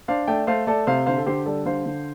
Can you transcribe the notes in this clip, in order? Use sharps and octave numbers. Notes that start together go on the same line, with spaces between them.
D4 C5 F5
A3 D5 G5
A3 C5 F5
A3 A4 D5
C3 C5 F5
D3 C5 F5
A4
D3 G4 C5
G3 A4 D5
D3 C5 F5
D3